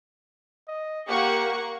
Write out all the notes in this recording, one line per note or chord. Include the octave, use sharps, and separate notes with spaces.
D#5
A#3 G4 F#5 C#6